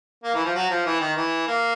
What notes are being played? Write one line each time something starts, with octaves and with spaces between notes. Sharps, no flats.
A#3
E3
F3
F#3
F3
E3
D#3
E3
A#3